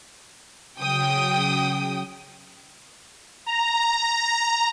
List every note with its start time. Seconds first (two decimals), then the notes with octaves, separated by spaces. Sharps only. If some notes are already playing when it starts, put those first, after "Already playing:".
0.79 C#3 F#3 G5 D#6
3.46 A#5